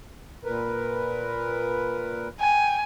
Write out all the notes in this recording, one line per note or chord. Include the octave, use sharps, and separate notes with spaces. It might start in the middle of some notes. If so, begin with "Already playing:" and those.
A#2 A#4 B4
G5 G#5